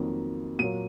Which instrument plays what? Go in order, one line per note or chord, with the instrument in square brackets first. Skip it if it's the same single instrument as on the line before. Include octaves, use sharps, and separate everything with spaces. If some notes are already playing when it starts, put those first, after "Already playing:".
Already playing: [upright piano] F2 D#3 F#3 A#3
A#2 F#3 A#3 D#7